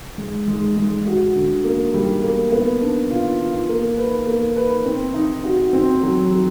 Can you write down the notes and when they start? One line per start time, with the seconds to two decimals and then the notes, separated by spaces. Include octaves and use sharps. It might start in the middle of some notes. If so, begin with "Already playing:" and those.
0.18 G#3
0.48 G#3
0.77 G#3
1.06 F#4
1.35 D3
1.64 A#3
1.94 G3
2.23 A#3
2.52 B3
2.81 D4
3.10 F4
3.40 F4
3.69 A#3
3.97 B4
4.27 A#3
4.56 B4
4.85 C4
5.14 D#4
5.44 F#4
5.73 C4
6.03 F#3
6.31 F#3